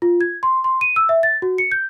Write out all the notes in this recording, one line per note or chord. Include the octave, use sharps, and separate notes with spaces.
F4
G#6
C6
C6
D#7
E6
E5
A6
F#4
C#7
G6